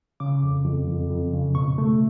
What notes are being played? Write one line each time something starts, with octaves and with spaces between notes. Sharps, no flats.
C#3 D6
F2
F2
F2
F2
C#3
B2 C#6
A3